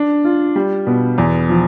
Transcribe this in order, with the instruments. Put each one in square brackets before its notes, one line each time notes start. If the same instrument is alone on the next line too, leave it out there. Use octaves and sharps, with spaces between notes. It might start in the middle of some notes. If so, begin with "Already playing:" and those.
Already playing: [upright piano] D4
F4
G3
B2
E2
F3